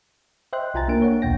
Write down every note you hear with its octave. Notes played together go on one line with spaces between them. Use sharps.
C5 D#5 E5 G5 C6 F#6
C2 F4 G#5 A#5 A6
A#3 D4 A#4 D7
C#5 F#5
B1 E2 B2 G5 A#6